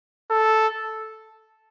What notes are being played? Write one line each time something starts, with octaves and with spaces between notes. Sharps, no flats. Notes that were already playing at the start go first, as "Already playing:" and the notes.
A4